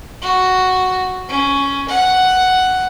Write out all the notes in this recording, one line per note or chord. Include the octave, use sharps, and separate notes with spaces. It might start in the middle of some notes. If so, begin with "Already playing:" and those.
F#4
C#4
F#5